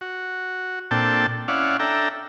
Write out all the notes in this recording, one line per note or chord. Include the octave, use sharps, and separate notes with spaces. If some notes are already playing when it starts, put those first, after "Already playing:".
F#4
A#2 C4 D4 A4 G5 A5
C#4 E4 D5 F5 F#5
D4 A4 E5 G5 A#5